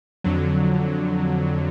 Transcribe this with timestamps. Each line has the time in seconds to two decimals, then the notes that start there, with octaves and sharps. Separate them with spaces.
0.24 F2 D3 F#3